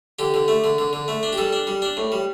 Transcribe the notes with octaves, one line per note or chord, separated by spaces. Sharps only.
D3 G4
D3
A3
D3
D3
D3
A3
D4
G4
G3 A4
D4
G3
D4
A2
G3